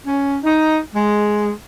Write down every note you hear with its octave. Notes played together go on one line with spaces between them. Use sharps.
C#4
D#4
G#3